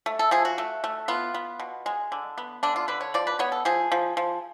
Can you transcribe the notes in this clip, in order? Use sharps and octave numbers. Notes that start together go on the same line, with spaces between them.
A3
A4
F3 G#4
F#4
A3
A3
B3 F4
B3
B2
G#3
D3
B3
D3 D4
F4
D3 B4
C#5
F3 D5
B4
B3 C#5
A4
F3 G#4
F3
F3